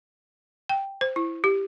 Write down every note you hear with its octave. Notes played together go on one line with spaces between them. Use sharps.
G5
C5
E4
G4